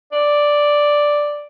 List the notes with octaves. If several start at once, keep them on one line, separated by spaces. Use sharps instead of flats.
D5